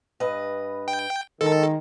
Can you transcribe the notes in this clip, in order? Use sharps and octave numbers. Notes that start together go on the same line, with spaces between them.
G2 B4 D#5
G5
D#3 G#3 A4